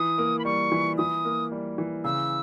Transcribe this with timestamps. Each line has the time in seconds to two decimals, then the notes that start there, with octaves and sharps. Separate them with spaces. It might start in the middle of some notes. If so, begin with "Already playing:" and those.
Already playing: E3 D#6
0.18 A#3
0.39 B5
0.45 G3 C#6
0.72 E3
0.98 E3 D#6
1.25 A#3
1.52 G3
1.78 E3
2.04 C#3 E6